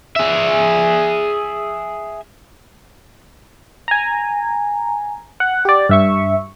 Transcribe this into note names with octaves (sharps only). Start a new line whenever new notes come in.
G#4 E5
G#5 A#5
F#5
G4 D5
G2 E5 C#6